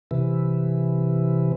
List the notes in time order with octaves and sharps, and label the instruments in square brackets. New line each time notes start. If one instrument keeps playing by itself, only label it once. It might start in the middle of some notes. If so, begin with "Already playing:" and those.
[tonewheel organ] C3 E3